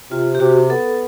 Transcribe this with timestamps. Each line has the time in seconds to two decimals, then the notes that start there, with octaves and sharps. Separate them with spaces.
0.11 C3 F4
0.35 G4
0.40 C3 F#4
0.70 B3 A4